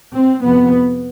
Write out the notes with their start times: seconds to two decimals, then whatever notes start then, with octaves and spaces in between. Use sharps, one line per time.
0.14 C4
0.44 F2 C3 B3